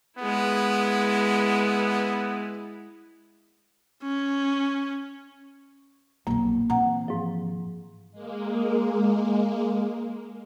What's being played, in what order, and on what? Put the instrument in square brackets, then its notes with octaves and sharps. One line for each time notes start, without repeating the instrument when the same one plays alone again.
[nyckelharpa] G#3 E4 [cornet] B3
[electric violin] C#4
[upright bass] B1 F2 [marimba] A#3
[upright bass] C3 E3 [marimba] F#5 A#5
[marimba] G#2 F3
[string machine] G#3 A#3